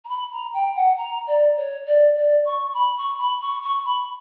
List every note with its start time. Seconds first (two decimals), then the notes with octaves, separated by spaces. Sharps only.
0.05 A#5
0.08 B5
0.31 A#5
0.53 G5
0.75 F#5
0.97 A#5
1.27 D5
1.56 C#5
1.86 D5
2.15 D5
2.45 C#6
2.74 B5
2.97 C#6
3.18 B5
3.41 C#6
3.62 C#6
3.85 B5